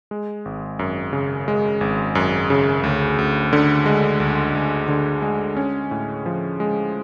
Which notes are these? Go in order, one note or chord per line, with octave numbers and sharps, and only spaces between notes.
G#3
G#1
F#2
C#3
G#3
G#1
F#2
C#3
D2
D2
D3
G#3
D2
D2
D3
G#3
C#4
A2
F3
G#3